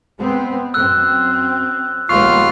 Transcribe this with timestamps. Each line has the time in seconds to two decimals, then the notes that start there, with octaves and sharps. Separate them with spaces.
0.18 G#3 B3 C4
0.74 F#2 C4 E6 F#6
2.09 A#1 D#2 G#3 B3 F4 C#6 F6 C7